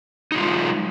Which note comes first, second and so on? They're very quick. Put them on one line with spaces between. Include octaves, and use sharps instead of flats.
D#4 F#3 F4 G#3